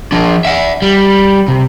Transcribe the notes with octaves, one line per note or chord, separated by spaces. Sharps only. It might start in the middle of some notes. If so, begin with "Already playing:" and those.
F3 D4
E5 F#5
G3
C3